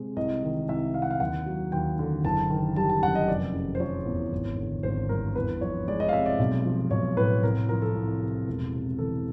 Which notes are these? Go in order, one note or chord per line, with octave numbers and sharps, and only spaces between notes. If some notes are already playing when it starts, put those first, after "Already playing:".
Already playing: C3 G#3
C2 D#5
D#3
C2 E5
C3 F5
F#5
F5
D#2 F#5
F#3
D#2 G5
D3
F#1 A5
D#3
G3 A5
A5
F#2 F#5
D#5
F1 D5
C#3
C5
F3 C#5
E2
G#1
D3
G#1 C5
G2 A#4
E2 B4
F3 C#5
G#3 D5
D#5
F5
C3 E5
D5
B1
F3
B1 C#5
A2 B4
C2 A#4
F3 A#4
A4
C2
C3
E1
C3
E3 A4